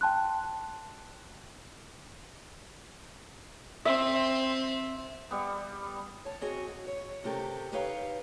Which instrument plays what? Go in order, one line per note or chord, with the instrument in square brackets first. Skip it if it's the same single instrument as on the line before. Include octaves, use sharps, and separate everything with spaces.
[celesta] G5 A5 C6 F#6
[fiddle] C4 [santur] E5
[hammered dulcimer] G3 B3
[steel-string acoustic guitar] C#5 A5
C4 F#4 G#4 C#5 D#5 G#5
F#4
C#5
C3 A3 C#4 G4 A4 A#4
D#4 G4 B4 C#5 F5